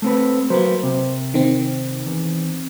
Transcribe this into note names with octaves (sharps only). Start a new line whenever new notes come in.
A3 C4 B4
F#3 A#3 B4 C5
C3
D#3 C4
E2